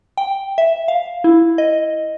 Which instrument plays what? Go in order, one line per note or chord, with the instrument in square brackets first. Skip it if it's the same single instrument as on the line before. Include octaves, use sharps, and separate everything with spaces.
[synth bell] G5
E5
F5
E4
D#5